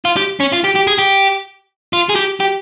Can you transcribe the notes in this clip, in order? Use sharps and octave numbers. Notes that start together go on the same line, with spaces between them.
F4
G4
C#4
F4
G4
G4
G#4
G4
F4
G#4
G4
G4